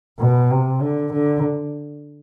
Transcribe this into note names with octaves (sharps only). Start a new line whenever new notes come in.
B2
C3
D3
D3